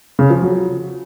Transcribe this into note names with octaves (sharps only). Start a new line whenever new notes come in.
C#3
F3
F#3